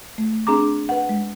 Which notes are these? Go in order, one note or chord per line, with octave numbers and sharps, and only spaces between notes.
A3
C4 D4 G#4 A#5 D6
B4 F#5
G#3